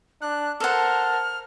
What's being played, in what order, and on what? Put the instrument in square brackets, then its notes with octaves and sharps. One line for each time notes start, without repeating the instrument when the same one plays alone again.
[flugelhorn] D4 [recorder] F#6
[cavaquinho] A4 F#5 [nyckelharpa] A#4 C5 [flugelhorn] A5 [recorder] F6